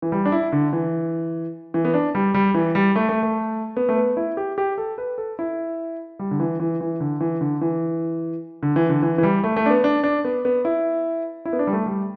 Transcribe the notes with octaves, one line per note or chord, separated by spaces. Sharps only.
E3
G3
D4
E4
D3
E3
E3
B3
D4
G3
G3
E3
G3
A3
A3
A3
B3
A3
B3
E4
G4
G4
A4
B4
A4
E4
G3
D3
E3
E3
E3
D3
E3
D3
E3
D3
E3
D3
E3
E3
G3
A3
A3
D4
B3
D4
D4
B3
B3
E4
E4
B3
D4
G3
A3
G3